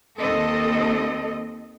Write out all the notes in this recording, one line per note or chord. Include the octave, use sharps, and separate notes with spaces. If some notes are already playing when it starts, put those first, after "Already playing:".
D#2 C4 A4 D#5